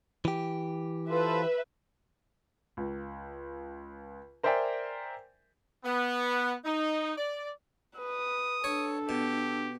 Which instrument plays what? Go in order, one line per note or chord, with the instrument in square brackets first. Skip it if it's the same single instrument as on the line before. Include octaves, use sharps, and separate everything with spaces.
[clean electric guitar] E3 G4
[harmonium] F4 A4 C5 [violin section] B4 E5
[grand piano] C#2
A#4 C5 D5 E5 G5 G#5
[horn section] B3
D#4
D5
[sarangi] B4 [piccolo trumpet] D#6
[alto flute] D4 [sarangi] A4 [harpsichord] C#5
[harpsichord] B2 [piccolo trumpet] G4